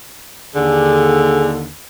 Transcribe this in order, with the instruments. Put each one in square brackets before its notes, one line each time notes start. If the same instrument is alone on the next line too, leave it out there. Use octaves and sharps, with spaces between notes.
[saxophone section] D#2 D3 [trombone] G#4